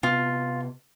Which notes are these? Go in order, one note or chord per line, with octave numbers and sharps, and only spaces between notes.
C3 B3 F4